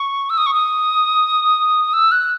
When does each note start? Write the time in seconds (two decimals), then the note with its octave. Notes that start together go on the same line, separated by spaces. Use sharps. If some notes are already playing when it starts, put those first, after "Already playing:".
Already playing: C#6
0.30 E6
0.37 D#6
0.46 C#6
0.54 D#6
1.93 E6
2.12 F#6